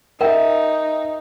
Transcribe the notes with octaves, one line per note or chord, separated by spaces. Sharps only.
D#4 A#4 E5 G5